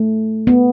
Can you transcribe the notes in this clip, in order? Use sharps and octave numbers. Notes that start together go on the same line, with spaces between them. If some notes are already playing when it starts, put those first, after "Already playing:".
Already playing: A3
B3